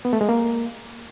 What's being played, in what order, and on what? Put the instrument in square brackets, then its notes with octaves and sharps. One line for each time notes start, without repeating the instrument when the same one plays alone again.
[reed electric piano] B3
A3
G#3
A#3